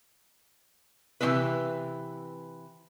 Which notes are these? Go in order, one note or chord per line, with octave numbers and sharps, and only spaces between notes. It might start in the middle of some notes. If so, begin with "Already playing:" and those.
C3 E3 C4 D#4 E4 B4